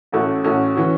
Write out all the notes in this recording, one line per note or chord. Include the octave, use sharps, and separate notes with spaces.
A1 A2 A3 C#4 F#4
A1 A2 A3 C#4 F#4
E3 C#4 F#4